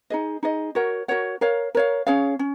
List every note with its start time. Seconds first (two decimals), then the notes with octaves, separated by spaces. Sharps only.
0.10 D#4 G#4 D#5
0.43 D#4 G#4 D#5
0.75 F#4 A#4 C#5 F#5
1.08 F#4 A#4 C#5 F#5
1.41 A#4 C#5 F5
1.75 A#4 C#5 F5
2.07 C#4 G#4 C#5 F5
2.39 C#4